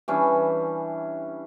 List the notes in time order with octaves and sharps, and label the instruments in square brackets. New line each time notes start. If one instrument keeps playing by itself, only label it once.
[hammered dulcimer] E3 G3 C#4 D4